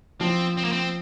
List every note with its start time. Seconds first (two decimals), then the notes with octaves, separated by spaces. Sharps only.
0.21 F3 C4
0.57 C4
0.64 A#3
0.72 C4